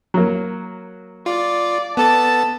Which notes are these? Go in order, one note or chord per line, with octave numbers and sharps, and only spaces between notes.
F#3 A#3
F4 D5
B3 A4 A5 A6